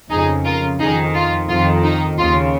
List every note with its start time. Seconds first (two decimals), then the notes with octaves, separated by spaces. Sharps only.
0.10 F2 C#3 D#4 G#4
0.45 F4 A#4
0.79 F2 D#3 D#4 G#4
1.14 F4
1.48 F2 D#3 F4
1.83 D#4
2.18 D#2 C#3 F4